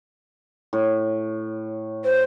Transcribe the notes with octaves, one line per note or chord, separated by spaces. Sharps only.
A2
C5